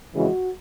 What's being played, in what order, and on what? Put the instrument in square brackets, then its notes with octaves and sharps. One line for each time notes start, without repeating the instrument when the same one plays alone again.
[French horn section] F2 C#3 E3 G#3 F#4